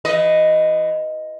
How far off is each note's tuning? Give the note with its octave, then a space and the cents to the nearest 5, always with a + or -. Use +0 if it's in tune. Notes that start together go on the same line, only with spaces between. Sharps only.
E3 +40 B4 +0 D#5 +0